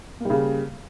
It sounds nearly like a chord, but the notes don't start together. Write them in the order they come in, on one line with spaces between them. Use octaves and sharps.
A#3 G3 C#3